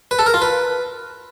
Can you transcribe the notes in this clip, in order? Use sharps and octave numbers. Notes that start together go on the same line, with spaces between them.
B4
A4
A#4
F4
B4